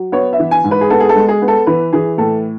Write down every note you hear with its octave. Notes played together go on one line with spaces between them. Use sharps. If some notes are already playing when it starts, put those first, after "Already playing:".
Already playing: F#3
B3 C#5
E5
E3
G#5
G#2
B4
G#4
B3 A4
G#4
A4
G#3
G#4
B3
A4
E3 B4
E3 G#4
A2 A4